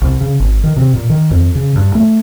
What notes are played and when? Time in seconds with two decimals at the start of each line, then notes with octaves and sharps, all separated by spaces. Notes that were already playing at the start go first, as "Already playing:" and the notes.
0.02 C2
0.21 C#3
0.40 G#1
0.64 D#3
0.77 C3
0.93 A#2
1.10 D#3
1.31 F2
1.55 C#3
1.76 G2
1.95 A3